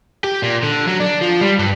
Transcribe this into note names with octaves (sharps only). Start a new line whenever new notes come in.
G4
A#2
D3
F#3
D4
F3
G3
G2